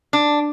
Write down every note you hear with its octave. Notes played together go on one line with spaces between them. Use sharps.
D4